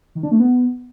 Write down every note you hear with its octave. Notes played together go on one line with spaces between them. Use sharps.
D#3
D4
A3
B3